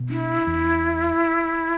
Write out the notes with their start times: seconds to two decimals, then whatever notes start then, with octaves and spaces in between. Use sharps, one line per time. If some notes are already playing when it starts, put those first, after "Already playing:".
Already playing: B2
0.09 D4 E4
0.47 E2